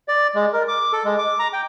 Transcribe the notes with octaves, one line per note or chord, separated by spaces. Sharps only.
D5
G#3
A#4
D6
A4
G#3
D6
A#5
G5